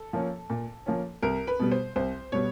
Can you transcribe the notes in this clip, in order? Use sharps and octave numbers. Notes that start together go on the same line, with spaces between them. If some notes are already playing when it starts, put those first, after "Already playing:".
Already playing: A4
F3 A#3 C#4
A#2
F3 A#3 C#4
C2 A#4
B4
B2 G3 B3
C5
C2 C5
B2 G3 B3 C#5